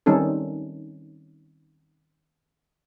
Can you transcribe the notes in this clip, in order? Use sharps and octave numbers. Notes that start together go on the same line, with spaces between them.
D#3 G3 C4 C#4 D#4 A4